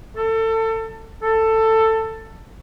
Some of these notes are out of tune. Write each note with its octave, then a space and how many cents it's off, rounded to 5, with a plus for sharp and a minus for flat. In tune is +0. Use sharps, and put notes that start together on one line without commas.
A4 +25
A4 +15